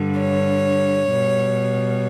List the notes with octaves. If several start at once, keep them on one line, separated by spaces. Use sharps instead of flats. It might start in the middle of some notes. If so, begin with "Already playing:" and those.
Already playing: G2 D3 G3
C#5
B2 G3